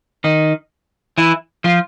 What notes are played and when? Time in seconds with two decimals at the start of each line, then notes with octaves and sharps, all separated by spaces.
0.24 D#3 D#4
1.18 E3 E4
1.64 F3 F4